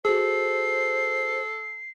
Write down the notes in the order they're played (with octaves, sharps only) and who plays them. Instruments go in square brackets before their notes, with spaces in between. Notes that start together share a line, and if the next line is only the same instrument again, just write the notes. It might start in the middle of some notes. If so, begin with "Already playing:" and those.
[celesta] F#4 G#4 [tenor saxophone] A4 [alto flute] C5 [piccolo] C7